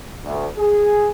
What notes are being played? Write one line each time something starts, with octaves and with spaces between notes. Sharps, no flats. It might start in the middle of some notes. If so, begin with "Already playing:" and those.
D2
G#4